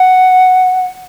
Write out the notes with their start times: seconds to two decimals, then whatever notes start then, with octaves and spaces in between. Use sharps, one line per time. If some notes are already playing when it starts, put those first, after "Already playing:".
Already playing: F#5